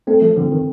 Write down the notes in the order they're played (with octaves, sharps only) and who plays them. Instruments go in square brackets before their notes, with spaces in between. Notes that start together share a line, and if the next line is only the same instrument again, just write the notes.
[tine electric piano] A3 C4 [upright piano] A4
[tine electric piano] F3 A3
[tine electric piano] D3 F3 [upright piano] C4
[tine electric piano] D#3